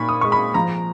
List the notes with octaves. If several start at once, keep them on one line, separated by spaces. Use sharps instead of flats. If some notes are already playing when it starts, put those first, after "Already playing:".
Already playing: A#2 D#4 B5 C#6
D#6
G#3 C#6
B5
F3 A#5